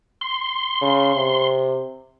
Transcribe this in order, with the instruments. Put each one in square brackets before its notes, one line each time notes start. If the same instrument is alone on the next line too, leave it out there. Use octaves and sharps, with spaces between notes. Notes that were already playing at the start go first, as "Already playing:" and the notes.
[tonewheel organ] C6
[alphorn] C#3
C3